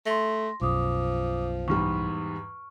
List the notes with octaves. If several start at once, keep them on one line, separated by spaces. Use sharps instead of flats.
A3 C6 A#6
B1 F#2 F3 D6 D#6
E2 G#2 G3 C#6 F6